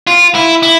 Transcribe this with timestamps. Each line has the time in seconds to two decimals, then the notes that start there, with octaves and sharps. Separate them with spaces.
0.07 F4
0.35 E4
0.63 E4